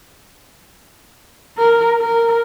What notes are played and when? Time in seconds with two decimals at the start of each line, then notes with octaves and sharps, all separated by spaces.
1.58 A#4
2.01 A#4